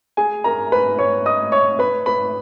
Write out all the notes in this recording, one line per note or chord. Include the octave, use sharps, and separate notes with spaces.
G#4 G#5
A#4 A#5
B4 B5
C#5 C#6
D#5 D#6
C#5 C#6
B4 B5
B4 B5